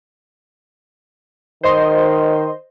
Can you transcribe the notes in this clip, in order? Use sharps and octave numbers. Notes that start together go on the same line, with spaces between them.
D#3 C5 D#5 C6